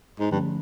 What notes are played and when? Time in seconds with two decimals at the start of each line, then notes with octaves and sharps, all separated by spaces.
0.20 G#2
0.31 G2 D3 F3 A3 C#4